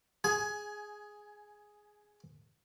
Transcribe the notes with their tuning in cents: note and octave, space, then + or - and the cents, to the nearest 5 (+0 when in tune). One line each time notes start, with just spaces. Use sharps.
G#4 +0 G#5 +20